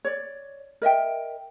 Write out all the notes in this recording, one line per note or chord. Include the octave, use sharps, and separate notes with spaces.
C#5 D5
A#4 D#5 E5 G5